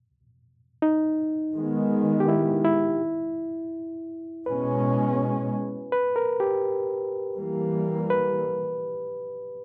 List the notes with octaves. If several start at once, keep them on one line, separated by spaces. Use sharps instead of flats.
D#4
D#3 G#3 B3
G4
E4
E4
B2 G#3 C#4 B4
B4
A#4
G4
E3 G3 A#3
B4